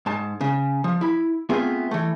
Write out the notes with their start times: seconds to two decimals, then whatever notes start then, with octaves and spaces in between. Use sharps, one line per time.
0.06 G#2 A5
0.41 C#3
0.84 F3
1.01 E4 B5
1.49 A3 B3 C4 F4 G#4
1.91 E3 A3